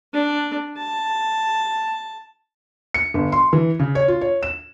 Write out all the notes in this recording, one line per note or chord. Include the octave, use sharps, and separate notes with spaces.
D4
A5
C#7
G1
C6
E3
C#3
C#5
F4
C#5
E7